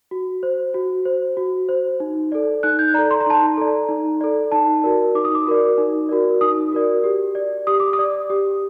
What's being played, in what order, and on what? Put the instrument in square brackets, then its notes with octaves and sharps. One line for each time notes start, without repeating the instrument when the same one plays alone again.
[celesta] F#4
C5
F#4
C5
F#4
C5
D#4
A4 D5
D#4 F#6
G6
A4 D5 A#5
C6
A#5
D#4 A5
A#5
A4 D5
D#4
A4 D5
D#4 A5
F#4 A#4 D5
D#4 D6
D#6
D6
F#4 A#4 D5
D#4
F#4 A#4 D5
D#4 D#6
F#4 A#4 D5
G4
D5
G4 D#6
D6
D#6
D5
G4